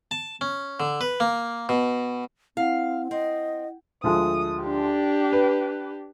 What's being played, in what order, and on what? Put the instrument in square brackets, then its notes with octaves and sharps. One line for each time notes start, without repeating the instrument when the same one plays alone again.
[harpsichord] A5
C#4
D3
B4
A#3
B2
[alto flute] C4 [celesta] E4 F#5 [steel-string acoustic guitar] F5
[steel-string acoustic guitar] C4 [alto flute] D#5
[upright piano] D2 F3 G#3 [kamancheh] D#6
[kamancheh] D4 G4
[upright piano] B4